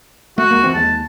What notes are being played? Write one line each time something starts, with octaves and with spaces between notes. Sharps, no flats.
A3 F#4
C#2 G#3 A#3
D1 E3 C4
D#2 G#3 A5